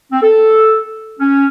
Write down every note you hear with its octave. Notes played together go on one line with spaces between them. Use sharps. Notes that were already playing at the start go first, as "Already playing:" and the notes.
C4
A4
C#4